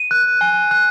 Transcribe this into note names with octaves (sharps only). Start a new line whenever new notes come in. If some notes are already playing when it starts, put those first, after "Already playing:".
Already playing: D#7
F#6
G#5
F#6